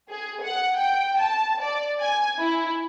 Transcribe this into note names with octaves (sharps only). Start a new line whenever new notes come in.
G#4
F#5
G5
A5
D5
G#5
E4